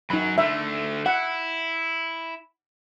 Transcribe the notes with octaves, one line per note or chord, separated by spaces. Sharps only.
F#2 F#3 D#4 B5
D3 A3 E5
E4 F#5